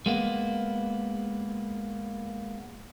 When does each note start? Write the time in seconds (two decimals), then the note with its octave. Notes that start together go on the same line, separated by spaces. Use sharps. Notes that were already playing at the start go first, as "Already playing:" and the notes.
0.06 G#3 A#3 B3